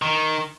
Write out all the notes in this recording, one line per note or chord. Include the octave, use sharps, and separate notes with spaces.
D#3